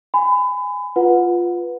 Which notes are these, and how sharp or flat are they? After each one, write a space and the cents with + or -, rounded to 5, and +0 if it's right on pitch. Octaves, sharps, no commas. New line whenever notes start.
G#5 -10 B5 +30
F4 +0 B4 +0 F#5 -15